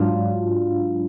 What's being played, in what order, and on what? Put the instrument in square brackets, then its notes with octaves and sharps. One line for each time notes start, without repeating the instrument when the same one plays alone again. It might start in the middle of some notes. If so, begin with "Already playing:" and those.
Already playing: [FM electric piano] G#2 F#3 D4 F4